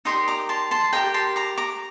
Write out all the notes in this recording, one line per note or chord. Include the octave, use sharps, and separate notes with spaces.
D#4 G4 A#4 D5 C6 D#6
A#5 D6
A5 C6
A5 C6
G4 A#4 D#5 G5 A#5
A5 C6
A#5 D6
A#5 D6